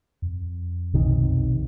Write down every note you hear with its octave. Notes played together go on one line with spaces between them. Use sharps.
F2
B1 C3 D#3